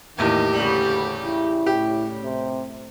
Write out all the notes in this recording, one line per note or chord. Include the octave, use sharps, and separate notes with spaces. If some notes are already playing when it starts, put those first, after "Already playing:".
E2 A2 D#3 A#3 G4
D2 C#3 G3
E4
A2 G4
C3